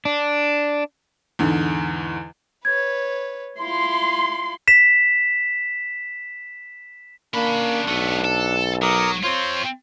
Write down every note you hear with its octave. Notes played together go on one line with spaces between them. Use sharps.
D4
E2 G#2 D3
B4 C#5 G#6
E4 F4 C6
B6 E7
A#3 C#4 D4 B5
B1 A3 B3
A4
F#3 A#4 D6 D#6
C4 F4 C5 C#5